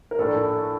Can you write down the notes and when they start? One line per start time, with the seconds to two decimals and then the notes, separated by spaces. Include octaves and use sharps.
0.11 A#4
0.18 A#1 A2 A3 D4 A4